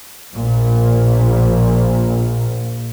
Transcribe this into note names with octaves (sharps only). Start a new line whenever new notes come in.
A#1 A#2